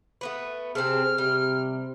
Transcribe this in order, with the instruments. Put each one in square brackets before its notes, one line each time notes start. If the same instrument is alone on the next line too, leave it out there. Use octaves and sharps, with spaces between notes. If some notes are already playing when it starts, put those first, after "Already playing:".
[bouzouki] A3 B3 B4
[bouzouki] C3 C4 A4 [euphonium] G#4 [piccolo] F6
[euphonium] C3 [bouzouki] G3